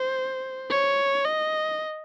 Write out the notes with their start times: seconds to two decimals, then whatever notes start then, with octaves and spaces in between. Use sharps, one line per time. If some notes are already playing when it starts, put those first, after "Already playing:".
Already playing: C5
0.70 C#5
1.25 D#5